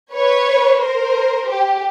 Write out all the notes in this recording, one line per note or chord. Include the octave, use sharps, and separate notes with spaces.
B4 C#5
A#4 C5
G4